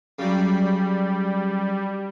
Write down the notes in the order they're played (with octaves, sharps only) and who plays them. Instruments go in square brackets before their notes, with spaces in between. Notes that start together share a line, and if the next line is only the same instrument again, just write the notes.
[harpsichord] C#3 F#3 [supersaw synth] G3